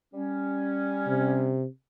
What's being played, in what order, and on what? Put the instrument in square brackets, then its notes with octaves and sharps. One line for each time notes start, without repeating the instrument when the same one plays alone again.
[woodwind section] G3 C#4
[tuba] C3